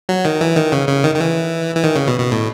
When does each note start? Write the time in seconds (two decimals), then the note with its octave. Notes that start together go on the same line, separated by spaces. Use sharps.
0.09 F#3
0.25 D#3
0.41 E3
0.56 D#3
0.72 C#3
0.88 C#3
1.04 D#3
1.15 D#3
1.20 E3
1.76 E3
1.84 D#3
1.95 C#3
2.08 B2
2.20 B2
2.31 A2